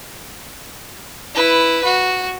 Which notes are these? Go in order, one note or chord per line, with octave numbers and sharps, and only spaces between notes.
E4 B4
F#4